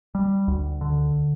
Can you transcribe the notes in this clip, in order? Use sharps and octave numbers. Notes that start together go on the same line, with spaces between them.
G3
D2
D3